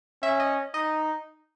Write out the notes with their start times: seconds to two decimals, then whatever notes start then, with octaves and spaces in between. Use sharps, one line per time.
0.22 C#4 E5
0.40 D#5
0.74 D#4 D#5